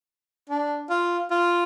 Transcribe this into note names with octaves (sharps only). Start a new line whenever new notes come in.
D4
F4
F4